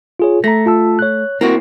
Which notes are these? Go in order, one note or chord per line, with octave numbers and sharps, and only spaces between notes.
F4 G#4 C#5
A3 A#5 A#6
F4 A5 E6
C#5 F#6
A#3 C4 E4 F#4